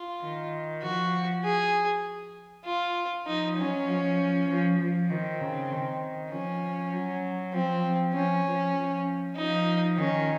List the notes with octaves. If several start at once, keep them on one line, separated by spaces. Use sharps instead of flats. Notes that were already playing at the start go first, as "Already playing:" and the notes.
Already playing: F4
D#3
F3 F#4
G#4
F4
F3 D#4
F#3 C#4
F3
F3
F3
D#3 C4
C#3
D#3
F3 C#4
F#3
F3 C4
F3 C#4
F3
F3
F3 D#4
D#3 C#4